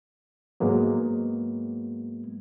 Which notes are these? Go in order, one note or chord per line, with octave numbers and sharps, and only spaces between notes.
G#2 F#3 G#3 A#3 B3